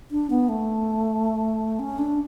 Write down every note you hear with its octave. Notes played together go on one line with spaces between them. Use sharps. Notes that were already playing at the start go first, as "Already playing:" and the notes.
D4
B3
A3
C#4
D4